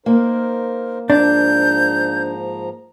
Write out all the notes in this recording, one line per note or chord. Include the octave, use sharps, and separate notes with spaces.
A#3 D#4 A#4 C5
G#2 F3 D4 A#5 G6